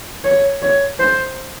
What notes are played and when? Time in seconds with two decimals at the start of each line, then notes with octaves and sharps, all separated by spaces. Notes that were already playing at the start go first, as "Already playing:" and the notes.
0.24 C#5
0.62 C#5
1.00 C5